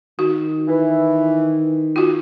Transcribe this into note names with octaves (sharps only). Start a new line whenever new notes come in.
D#3 F#4
E3
F4 F#4